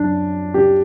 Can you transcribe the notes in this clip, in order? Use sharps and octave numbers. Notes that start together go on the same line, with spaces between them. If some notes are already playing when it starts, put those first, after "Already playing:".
Already playing: F#2 D4
G4